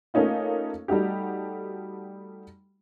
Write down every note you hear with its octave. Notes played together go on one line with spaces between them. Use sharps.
A3 A#3 C#4 D#4 F4
G3 A3 D#4 F#4 G4